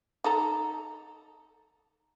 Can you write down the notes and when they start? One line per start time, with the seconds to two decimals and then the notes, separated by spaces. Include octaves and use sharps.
0.24 D#4 A4 A#5